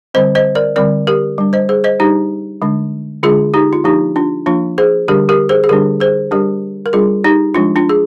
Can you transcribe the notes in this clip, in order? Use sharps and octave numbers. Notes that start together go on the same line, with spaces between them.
D3 G3 C4 C5 D#5
C5 D#5
A#4 D5
D3 G3 C4 A#4 D5
G4 A#4
G3 D4
C5 D#5
G#4 C5
C5 D#5
G3 D4 D#4 G4
D3 G#3 D4
D3 G#3 D4 F4 G#4
D#4 G4
F4
F3 A#3 D4 D#4 G4
D4 F4
F3 A#3 D4 F4
G#4 C5
D3 G3 D4 G4 A#4
G4 A#4
G#4 C5
G#4
D3 G3 D4 G4 A#4
G#4 C5
G3 D4 G4 A#4
A#4
G3 D4 F4 G#4
D#4 G4
F3 G#3 D4 F4
D4 F4
G#4